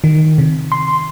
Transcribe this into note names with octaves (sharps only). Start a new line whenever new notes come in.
D#3
C3
C6